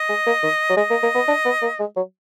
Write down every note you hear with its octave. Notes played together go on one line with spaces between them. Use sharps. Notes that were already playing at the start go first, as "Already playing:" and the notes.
Already playing: D#5
G#3
A#3
D#3
F#3
G#3 D#5
A#3
A#3
B3
D4
B3
A#3
G#3
F#3